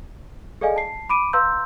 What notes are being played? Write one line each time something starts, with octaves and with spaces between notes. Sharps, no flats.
G#4 A4 D5 D#5 F5 G#5
A5 C7
B5 D6 D7 D#7
B4 F5 A#5 C6 E6 G6